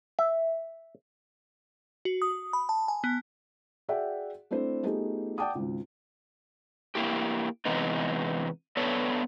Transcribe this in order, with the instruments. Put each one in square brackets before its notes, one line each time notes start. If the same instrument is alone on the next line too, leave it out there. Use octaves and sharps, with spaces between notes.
[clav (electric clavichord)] E5
[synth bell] F#4
D#6
B5
A5
G#5
B3
[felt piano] F#4 G#4 D5 E5 F#5 G5
A3 C4 D4 E4 C5
A3 B3 D#4 F4 G4 G#4
D5 F#5 G5 A5 D6 D#6
G#1 C#2
[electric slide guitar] A#3 E4 G4
E2 C3 E3 G#3 B3 D#4
B3 D4 A4 B4 C#5